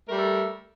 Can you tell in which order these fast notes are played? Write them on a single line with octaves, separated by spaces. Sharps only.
A#4 A3 G3 A4